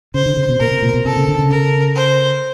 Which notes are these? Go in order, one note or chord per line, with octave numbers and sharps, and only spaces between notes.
C#3 C5
D3
C#3
B2
A#2 A#4
C3
A#2
B2
C3 A4
C#3
D3
C#3
A#4
C5